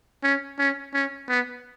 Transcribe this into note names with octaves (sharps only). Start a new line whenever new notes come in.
C#4
C#4
C#4
B3